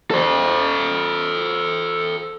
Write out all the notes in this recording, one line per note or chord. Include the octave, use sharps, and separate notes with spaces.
A4 C5